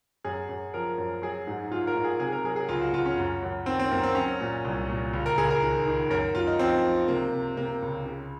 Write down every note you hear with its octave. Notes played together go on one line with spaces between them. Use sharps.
F#2 G#4
F#2
F3 A#4
F#2
F#3 G#4
G#2
G#2 F4
A#4
G#2
G#4
C3 G#4
A#4
F#3 G#4
G#4
C#2 F4
F#4
C#2 F4
C#4
F#2
F#2
D#3 C4
C4
F#2 A#3
C4
F#3 C#4
A#2
C2
A#2
C#2
A#4
C#2 G#4
A#4
D#3
D#3
F#2 A#4
F#2 F4
D#4
F3 C4
F3
C3 A#3
C3
C3 A#3
C#2
C#3